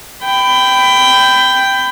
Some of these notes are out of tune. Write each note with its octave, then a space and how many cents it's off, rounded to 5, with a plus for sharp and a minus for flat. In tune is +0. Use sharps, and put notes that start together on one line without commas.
G5 +0 B5 +25